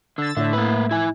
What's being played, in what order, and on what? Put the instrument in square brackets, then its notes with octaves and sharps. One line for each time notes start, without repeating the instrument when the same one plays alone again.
[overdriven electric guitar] D3 [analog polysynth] E6 A6
[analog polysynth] A2 A3 E5 [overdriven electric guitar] D3
[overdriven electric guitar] A#3 B4
E4 G#5